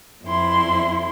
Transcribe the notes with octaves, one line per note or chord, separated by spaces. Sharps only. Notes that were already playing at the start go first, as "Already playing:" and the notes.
F2 E4 C6